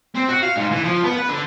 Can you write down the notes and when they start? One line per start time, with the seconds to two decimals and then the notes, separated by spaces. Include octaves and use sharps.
0.15 C4
0.28 F#4
0.43 F5
0.56 G#2
0.71 E3
0.84 F3
1.04 B3
1.17 B4
1.29 D3